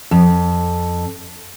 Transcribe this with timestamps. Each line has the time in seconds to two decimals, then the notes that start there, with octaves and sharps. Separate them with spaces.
0.11 F2